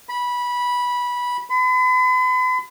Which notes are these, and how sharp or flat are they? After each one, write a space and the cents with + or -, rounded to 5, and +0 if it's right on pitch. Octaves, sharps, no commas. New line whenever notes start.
B5 -15
B5 +40